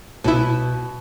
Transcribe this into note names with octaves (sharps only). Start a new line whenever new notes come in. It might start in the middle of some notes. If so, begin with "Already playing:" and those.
C2 B2 E4